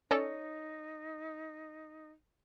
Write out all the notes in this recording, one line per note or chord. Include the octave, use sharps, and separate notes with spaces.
C#4 D#4 A4 C#5 D5